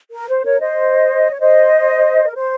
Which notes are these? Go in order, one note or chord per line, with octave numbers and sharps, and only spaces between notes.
A#4
C5
A#4 C#5
C5 D#5
C#5
C5 D#5
A#4
C5